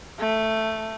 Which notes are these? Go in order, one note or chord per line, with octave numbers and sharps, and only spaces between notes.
A3